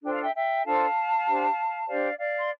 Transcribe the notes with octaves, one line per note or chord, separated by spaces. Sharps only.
D4 F4 A4 C5 G5
F5
E5 G5
E5 G5
D4 F4 A4 C5 F5 A5
D4 G4 C5
D4 G4 C5 D5 F5
D5 F5
C6